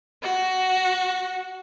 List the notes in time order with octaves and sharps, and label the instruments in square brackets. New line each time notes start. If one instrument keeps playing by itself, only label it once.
[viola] F#4